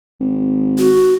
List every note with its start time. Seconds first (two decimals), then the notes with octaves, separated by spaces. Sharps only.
0.20 G#1
0.78 F#4